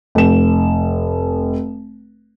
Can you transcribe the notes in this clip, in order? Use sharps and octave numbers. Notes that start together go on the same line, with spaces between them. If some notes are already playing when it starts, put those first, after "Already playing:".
F1 E7